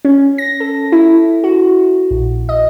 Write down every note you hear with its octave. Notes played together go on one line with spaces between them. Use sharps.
C#4
A#6
A4
E4
F#4
A#1
D#5